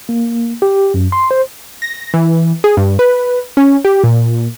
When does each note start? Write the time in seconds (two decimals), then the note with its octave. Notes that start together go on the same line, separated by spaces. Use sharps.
0.09 A#3
0.62 G4
0.94 F#2
1.12 C6
1.31 C5
1.82 A#6
2.14 E3
2.64 G#4
2.77 G2
2.99 B4
3.57 C#4
3.85 G4
4.04 A#2